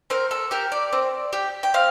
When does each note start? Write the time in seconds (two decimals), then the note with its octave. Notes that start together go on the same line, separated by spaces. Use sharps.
0.10 C4 A#4
0.31 A4
0.51 G4 A#4
0.72 D5
0.93 C4
1.33 G4
1.63 G5
1.74 C4 F5